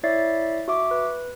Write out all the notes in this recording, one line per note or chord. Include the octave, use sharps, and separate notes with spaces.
E4 C#5 D5 E5 A6 C7
F#4 E5 D6
B4